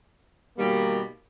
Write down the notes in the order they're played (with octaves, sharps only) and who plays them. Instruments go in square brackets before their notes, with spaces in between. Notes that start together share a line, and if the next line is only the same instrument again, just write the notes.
[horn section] B2 D#3 G3 [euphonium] A#3